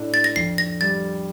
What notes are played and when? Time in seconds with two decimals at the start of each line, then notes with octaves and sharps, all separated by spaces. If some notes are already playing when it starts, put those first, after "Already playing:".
Already playing: A2 D4
0.14 A6
0.24 A#6
0.36 F2 C7
0.58 A#6
0.81 G3 A6